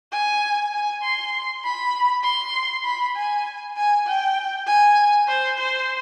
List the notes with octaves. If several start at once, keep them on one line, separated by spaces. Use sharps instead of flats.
G#5
G#5
C6
B5
C6
B5
G#5
G#5
G5
G#5
C5
C5